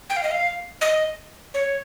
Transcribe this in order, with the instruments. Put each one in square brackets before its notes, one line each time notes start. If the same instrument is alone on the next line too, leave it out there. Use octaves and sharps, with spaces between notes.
[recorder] G5
F5
D#5
F5
D#5
C#5